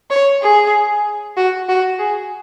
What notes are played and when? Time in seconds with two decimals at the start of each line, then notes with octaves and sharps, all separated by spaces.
0.10 C#5
0.42 G#4
1.37 F#4
1.69 F#4
1.99 G#4